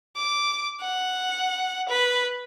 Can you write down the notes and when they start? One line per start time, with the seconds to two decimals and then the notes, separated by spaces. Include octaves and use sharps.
0.16 D6
0.81 F#5
1.88 B4